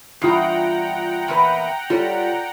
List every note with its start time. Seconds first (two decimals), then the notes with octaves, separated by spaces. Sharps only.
0.22 E2 G2 F4 F#5 G5 A#5 D#6 C7
1.28 E2 A#2 B4
1.90 G3 F4 A4 C#5